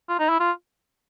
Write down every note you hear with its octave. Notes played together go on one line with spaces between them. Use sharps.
F4
D#4
E4
F4